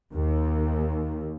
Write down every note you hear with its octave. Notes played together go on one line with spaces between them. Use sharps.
D#2